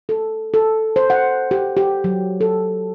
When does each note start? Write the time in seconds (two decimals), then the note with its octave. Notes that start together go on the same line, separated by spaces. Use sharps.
0.09 A4
0.54 A4
0.96 C5
1.10 F#5
1.51 G4
1.77 G4
2.04 F#3
2.41 A4